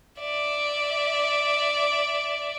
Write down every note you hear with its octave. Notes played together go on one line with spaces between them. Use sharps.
D5 E5